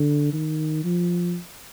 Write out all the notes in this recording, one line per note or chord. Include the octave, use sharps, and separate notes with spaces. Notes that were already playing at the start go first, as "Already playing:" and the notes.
Already playing: D3
D#3
F3